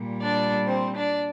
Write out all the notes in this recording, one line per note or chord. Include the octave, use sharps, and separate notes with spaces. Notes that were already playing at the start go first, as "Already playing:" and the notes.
Already playing: A#2 G3
D4 D5
C4 C5
D4 D5